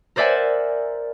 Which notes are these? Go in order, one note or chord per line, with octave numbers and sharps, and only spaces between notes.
A#4 C5 D5 E5 F#5 G#5